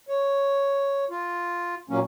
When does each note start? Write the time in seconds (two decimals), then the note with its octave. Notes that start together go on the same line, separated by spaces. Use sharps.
0.09 C#5
1.10 F4
1.90 A#2 F#3 A#3 C#4